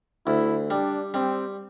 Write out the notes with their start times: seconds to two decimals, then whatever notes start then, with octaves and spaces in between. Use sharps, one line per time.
0.26 D2 E4
0.70 G3 D4
1.14 G3 C4